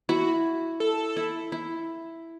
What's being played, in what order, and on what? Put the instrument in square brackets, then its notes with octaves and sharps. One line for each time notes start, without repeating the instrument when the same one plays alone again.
[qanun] E4 [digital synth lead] F#4
[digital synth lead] A4
[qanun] E4
E4